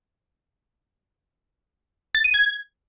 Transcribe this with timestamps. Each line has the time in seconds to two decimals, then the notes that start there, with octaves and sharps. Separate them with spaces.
2.15 A6
2.24 D#7
2.34 G#6